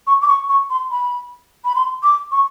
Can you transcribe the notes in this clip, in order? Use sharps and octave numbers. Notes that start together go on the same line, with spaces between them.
C#6
D6
C#6
C#6
C6
B5
B5
C6
D6
C#6